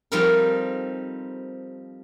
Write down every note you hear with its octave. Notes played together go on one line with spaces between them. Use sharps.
F3 G3 C4 D#4 A4 A#4